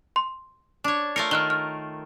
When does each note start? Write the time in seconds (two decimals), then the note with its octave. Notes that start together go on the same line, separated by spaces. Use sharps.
0.16 C6
0.84 D4 C#5
1.16 A3 F4 A#4 C#7
1.31 D#3 F6 F#6 G7
1.50 F6